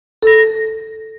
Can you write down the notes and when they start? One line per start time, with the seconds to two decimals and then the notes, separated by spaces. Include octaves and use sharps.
0.23 A4 A#6